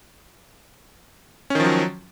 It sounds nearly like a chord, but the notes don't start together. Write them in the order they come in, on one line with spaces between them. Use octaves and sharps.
C#4 D#3 F3 F#3